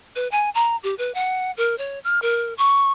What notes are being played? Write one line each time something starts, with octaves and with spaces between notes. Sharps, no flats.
B4
G#5
A#5
G4
B4
F#5
A#4
C#5
F6
A#4
C#6